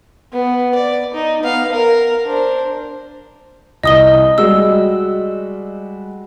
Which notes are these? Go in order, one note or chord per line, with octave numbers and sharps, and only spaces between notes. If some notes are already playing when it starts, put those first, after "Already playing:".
B3
D5
D#4
B3 F5
A#4
D4 C5
C2 D#5 D#6 G7
G3 G#3 F#4 E6